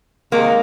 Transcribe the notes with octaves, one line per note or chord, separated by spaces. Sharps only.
C3 D#3 G#3 A#3